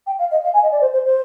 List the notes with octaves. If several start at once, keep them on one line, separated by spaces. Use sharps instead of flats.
G5
F5
D#5
F5
G#5
D#5
D5
C5
C5
C5